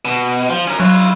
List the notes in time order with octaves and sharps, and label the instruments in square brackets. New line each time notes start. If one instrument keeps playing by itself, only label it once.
[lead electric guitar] B2
F3
C#4 A#4
[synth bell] F#3 [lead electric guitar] E4 F4